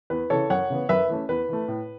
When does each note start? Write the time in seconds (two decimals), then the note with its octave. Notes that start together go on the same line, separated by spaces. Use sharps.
0.10 E2 B4
0.30 C#3 E3 A4 C#5
0.50 F#2 C#5 F#5
0.70 C#3 E3 B3
0.89 F#2 B4 E5
1.09 E3 A3 C#4
1.29 E2 B4
1.49 E3 A3
1.68 A2